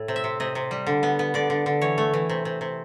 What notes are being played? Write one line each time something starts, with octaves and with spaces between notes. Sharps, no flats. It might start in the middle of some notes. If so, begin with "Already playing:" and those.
Already playing: A2
C3
E5
C3
C3 D#5
C3
G3
D3
B3
B3
D3 D5
D3
D3
E3 C#5
A3
E3
C3
C3
C3